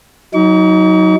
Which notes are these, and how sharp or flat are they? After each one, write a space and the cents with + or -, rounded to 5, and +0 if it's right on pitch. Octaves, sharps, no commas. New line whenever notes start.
F#3 +0 D#4 +25 C#6 +45